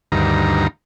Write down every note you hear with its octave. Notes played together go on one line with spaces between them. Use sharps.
D2 G2 D#3 A#5